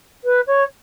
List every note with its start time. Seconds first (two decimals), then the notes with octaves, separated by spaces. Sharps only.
0.24 B4
0.47 C#5